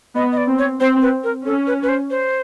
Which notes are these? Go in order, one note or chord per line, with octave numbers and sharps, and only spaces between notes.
B3 D#5
D#5
D5
C4
C#5
C4 C5
B4
A#4
C#4 A4
B4
B4
C5
C5